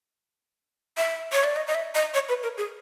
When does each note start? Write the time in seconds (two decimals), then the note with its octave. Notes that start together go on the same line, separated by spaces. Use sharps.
0.97 E5
1.32 C#5
1.44 D5
1.56 D#5
1.67 D#5
1.75 E5
1.95 D#5
2.14 C#5
2.29 B4
2.43 A#4
2.58 G#4